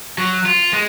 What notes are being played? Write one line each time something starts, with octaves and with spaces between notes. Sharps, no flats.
F#3
F4
G#3